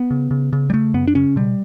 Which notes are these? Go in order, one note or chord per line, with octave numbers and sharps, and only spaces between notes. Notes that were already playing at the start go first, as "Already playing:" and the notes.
Already playing: B3
C#3
C#3
C#3
G3
C#3 A3
F#2 B3
D4
C#3 C#4
B2 G3